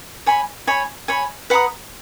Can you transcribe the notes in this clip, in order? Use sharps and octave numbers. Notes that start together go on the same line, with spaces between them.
C#5 G#5 B5
C#5 G#5 B5
C#5 G#5 B5
B4 F#5 A#5 D#6